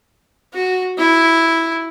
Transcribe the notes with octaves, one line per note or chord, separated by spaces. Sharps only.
F#4
E4